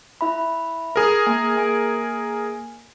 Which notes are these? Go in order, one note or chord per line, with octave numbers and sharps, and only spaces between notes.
E4 E5 B5
G#4 A#4
A#3 G#5
A#3 G#5 D7